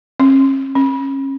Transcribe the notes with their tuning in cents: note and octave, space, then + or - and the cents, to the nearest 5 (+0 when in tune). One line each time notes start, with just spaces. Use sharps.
C#4 -40
C#4 -30